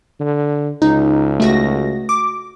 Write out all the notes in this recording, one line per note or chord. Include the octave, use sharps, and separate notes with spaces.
D3
C#2 D#4
A3 F#4 A#6
D6